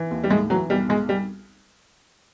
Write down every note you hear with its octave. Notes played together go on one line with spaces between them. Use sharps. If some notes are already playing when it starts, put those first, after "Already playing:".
Already playing: E3
D#2
G3
A2 G#3
E3 F#3
B1 G3
B1 G#3
G3